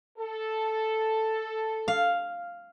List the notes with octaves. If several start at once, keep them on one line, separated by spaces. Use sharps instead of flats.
A4
F5